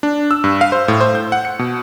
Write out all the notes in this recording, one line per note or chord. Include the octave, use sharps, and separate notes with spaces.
D4
E6
G2
F5
C5
A2
C5
G6
F#5
C#7
B2